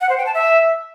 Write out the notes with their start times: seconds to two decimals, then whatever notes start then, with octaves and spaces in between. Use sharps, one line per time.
0.01 F#5
0.09 C5
0.18 G5
0.26 A5
0.34 E5